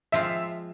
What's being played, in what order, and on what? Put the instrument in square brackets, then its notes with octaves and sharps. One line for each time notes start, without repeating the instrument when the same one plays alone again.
[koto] F3 G#3 C4 F4 [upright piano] E5